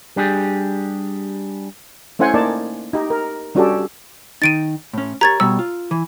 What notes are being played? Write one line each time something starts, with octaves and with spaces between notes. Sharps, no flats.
G3 D4 G4 G#4
A3 C#4 E4 C5 F#5 G#5
A#3 D#4 D5 A5
D#4 G4
A#4
G3 C#4 D4 F#4 G4 A4
D#3 D#4 A6 D7 D#7
A2 C#4
G4 A#4 C#5 A#5 G#6 A6
B2 G3 C#5 E6
F4
E3